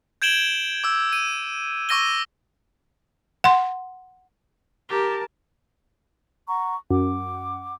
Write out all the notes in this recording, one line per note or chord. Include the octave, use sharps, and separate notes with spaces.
G6 G#6 D7 E7 F#7 G7
D6 E6
D#7
C#6 D6 E6 A#6 D#7 G7
F#5 C6
G4 A#4 A5
F#5 A#5 C#6
F#2 F#5 D6